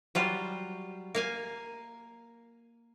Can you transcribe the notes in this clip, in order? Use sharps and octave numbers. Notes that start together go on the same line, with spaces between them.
F#3 G3 F4
A#3 F5 G#5